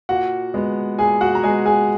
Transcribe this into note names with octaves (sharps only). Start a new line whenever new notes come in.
A#2 F#4 F#5
G#3 B3
A#2 G#4 G#5
F#4 F#5
A#5
G#3 B3 G#4 G#5
G#4 G#5